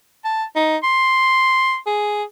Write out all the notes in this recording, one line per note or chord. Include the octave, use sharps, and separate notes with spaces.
A5
D#4
C6
G#4